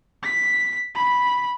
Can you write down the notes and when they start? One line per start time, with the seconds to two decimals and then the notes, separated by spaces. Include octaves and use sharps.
0.23 B6
0.95 B5